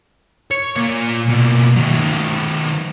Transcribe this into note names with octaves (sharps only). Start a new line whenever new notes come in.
C#5
A#2
B2 A#3
D#3 F#3